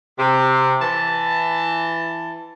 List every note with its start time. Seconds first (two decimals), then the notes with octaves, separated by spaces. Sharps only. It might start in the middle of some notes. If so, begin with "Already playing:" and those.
0.19 C3
0.82 E3 A5